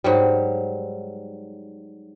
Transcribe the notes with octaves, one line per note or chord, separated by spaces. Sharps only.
G#2 F#3 G3